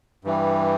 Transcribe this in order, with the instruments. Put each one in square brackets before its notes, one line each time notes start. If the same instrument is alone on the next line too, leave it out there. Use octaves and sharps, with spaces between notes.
[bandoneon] G2 E3 G3